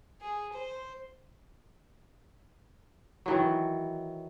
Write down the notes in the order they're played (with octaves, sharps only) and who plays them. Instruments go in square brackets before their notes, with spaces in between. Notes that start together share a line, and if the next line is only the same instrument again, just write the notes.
[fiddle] G#4
C5
[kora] D#3 E3 F#3